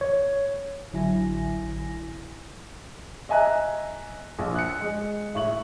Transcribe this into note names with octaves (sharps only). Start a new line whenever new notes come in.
C#5
A1 D3 F#3 E4 G#5 A#6
D#5 E5 G#5 A#5 F#6
A#1
F#6 C#7
G#3
A2 E4 C#6 F#7